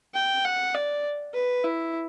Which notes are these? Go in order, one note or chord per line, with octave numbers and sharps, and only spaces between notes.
G5
F#5
D5
B4
E4